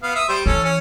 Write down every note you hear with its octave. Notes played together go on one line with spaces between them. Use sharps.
B3 F5
E5 D#6
G3 C5
E3 C#4 A4
C#4